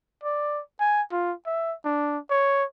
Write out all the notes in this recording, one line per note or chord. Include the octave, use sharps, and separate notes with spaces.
D5
G#5
F4
E5
D4
C#5